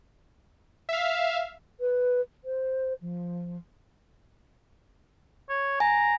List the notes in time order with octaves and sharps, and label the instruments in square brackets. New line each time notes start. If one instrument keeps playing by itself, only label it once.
[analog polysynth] E5 F5
[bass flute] B4
C5
F3
[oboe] C#5
[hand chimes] G#5 [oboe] A#5